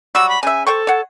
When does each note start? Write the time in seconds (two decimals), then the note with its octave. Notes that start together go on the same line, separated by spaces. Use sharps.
0.15 F#3 G3 F#4 E6
0.29 B5
0.43 C#3 E5 G#5
0.67 A4 C5 G5 C#6
0.87 C#5 F#5